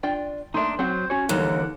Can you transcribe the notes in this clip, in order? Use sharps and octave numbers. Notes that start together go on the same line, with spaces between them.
D4 F4 G5
A3 A#3 D4 D#4 E5 C6
F#3 C4 C5 F#5 A5
C#4 F#4 C#5 G#5
D#2 D3 E3 F#3 G3 A4 A#4 F#5